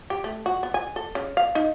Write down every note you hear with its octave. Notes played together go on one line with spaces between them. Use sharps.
G4
A3
F#4
B3
G#5
A4
C#3
F5
D#4